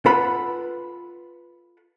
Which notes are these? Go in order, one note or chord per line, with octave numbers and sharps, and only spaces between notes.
F4 A4 B4 F#5 B5